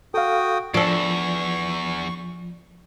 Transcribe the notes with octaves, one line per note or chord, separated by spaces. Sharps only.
F#4 A4 F5 G5 D#6
E2 F3 D4 A4 C#6